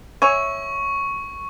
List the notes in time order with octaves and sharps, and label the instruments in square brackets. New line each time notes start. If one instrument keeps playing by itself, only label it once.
[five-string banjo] C#5 E5 G#5 [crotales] C#6